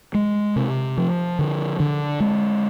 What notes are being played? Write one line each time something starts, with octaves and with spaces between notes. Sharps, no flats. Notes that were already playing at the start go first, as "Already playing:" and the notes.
G#3
C3
F3
D3
D3
G#3